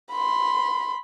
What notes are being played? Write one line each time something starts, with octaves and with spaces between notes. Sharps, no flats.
B5 C6